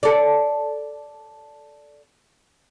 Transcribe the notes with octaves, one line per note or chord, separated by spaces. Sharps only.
A4 D5